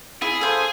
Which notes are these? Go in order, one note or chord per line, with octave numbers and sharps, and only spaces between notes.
E4 G#4
A4 C5 F5